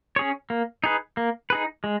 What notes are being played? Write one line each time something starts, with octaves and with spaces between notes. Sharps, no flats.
C#4 G#4 C#5
A#3
D#4 G#4 B4
A#3
D#4 G#4 B4
G#3